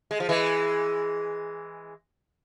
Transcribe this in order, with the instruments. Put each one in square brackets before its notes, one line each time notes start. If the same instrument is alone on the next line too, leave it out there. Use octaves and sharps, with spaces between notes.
[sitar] G#3
F3
E3 G#3